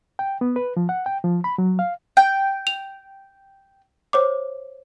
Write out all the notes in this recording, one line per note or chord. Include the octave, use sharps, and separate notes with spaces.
G5
B3
B4
F3
F#5
G5
F3
B5
F#3
F5
G5
F7
C5 C#5 D6